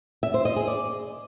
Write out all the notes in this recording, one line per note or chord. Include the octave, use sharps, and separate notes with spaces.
E5
C5
D#5
G#4
D5